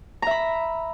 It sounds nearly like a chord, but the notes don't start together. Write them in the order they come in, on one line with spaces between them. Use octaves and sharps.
A#5 E5 B5